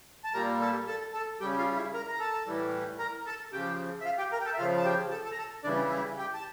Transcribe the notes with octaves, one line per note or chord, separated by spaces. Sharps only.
A5
A#2 G3 A#4 A#5
A4 A5
A4 A5
A4 A5
C#3 G3 G4 G5
F4 F5
E4 E5
A#4 A#5
A#5
A4 A5
A2 E3 G3
A#4 A#5
A4 A5
C#3 F3 G4 G5
E5
F4 F5
G4 G5
A#4 A#5
G5
A4 A5
E5
C#3 F3 F4 F5
A5
G4 G5
A4 A5
A4 A5
A#5
A4 A5
C#3 E3 G3 D4 D5
E4 E5
G4 G5
A5